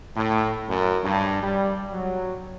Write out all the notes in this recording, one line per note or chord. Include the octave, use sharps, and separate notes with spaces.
A2
F#2
G2
G3
F#3